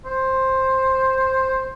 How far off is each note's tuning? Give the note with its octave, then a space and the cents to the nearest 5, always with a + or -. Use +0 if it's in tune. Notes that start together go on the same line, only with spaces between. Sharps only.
C5 +10